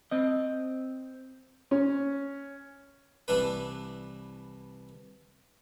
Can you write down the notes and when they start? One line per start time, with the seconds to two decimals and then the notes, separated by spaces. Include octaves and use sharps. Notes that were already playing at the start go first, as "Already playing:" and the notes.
0.11 C4 D#5
1.71 C#4
3.28 C2 E3 D4 B4